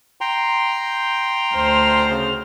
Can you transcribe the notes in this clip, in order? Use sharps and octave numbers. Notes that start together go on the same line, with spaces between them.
G5 A#5 C6
D2 C5 F6
C#3